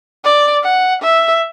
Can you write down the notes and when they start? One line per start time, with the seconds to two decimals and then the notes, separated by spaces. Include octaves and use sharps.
0.24 D5
0.63 F#5
1.02 E5